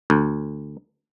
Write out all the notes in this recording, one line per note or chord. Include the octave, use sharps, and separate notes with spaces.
D2